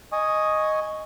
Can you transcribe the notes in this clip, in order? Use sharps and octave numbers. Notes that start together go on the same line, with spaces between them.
D#5 G#5 C#6 D#6